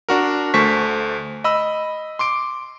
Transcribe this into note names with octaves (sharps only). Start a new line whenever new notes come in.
D4 F#4 A#4
D2 A3 C5 C#6 B6
D#5 B5 E6
C6 D6 D7